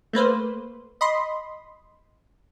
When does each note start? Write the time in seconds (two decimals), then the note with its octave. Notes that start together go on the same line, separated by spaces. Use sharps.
0.13 A3 A#3 B4 C5
1.01 D#5 B5 C6